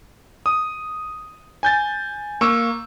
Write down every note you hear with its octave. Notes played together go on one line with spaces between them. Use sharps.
D#6
G#5 G6 A6
A#3 C#6 E6